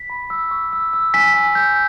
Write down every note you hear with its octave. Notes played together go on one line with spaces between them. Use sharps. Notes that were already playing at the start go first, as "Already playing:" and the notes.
Already playing: B6
B5
E6
C#6
E6
E6
G#5 B6
G#5
G6